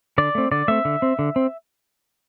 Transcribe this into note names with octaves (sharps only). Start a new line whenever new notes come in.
D3 D5
A3 C4
D3 D5
A3 C4 E5
D3
C4
D3
C4